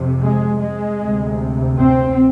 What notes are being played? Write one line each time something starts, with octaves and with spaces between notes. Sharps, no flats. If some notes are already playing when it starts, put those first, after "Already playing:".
Already playing: F2 C3
G#3
G#3
D2 C3
C4